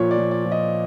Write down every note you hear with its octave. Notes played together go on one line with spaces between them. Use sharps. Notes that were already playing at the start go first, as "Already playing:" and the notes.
Already playing: A#2 F3 C#5
D5
F3
D5
F3
D#5